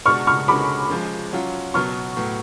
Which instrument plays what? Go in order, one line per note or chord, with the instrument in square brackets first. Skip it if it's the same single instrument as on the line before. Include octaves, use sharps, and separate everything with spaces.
[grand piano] B2 G#3 D4 F#4 [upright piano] C#6 F6
[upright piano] C#6 F6
[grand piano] D3 G#3 C#4 F#4 [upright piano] B5 D6
[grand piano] C#3 F3 G#3
F#3 C#4 F4
[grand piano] B2 F#3 B3 [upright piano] C#6 F6
[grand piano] A2 F#3 B3